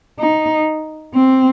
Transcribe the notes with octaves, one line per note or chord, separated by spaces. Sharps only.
D#4
C4